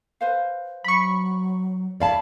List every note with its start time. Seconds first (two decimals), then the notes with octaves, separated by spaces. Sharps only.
0.21 B4 C5 F5
0.84 F#3 B5 C#6
2.00 C#5 D5 E5 F5 A5 B5